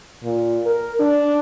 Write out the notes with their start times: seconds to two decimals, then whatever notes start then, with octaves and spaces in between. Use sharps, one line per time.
0.24 A#2
0.66 A#4
1.00 D4